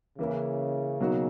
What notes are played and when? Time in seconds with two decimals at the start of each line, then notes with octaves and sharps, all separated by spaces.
0.19 C#3 E3 A#3 E4
1.00 B2 F#3 A#3 D#4 F#4